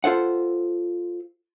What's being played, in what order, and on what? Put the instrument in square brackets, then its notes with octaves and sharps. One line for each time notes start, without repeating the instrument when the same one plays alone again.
[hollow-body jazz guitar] F4 A4 C5 F#5